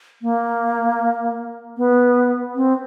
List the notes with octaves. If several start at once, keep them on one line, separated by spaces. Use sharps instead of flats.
A#3
B3
C4